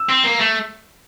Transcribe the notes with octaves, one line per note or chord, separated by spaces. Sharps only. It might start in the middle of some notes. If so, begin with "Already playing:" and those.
Already playing: E6
C4
A#3
A3